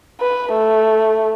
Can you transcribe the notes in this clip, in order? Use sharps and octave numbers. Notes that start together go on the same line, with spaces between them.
B4
A3